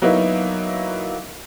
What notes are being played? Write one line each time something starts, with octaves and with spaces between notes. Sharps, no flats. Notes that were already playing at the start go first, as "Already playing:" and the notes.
F#3 A#3 B3 D#4 E4